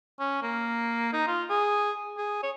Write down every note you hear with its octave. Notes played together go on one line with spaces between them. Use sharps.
C#4
A#3
D#4
F4
G#4
G#4
C#5